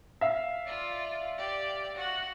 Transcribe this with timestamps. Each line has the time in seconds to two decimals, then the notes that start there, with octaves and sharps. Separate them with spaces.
0.21 E5 F5
0.65 F4 D5
1.38 G4 D5
1.94 F#4 F#5